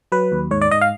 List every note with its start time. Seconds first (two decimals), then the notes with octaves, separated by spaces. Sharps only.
0.12 F#3 B4
0.32 D#2
0.51 G#2 C#5
0.61 D5
0.71 G#2 D#5
0.81 F5